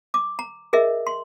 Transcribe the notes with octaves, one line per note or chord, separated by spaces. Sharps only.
D6
A#5
G#4 A#4 D#5 E5
C6